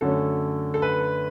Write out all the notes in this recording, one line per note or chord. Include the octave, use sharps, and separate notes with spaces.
F#2 D3 A3 C#4 A4
A4
B4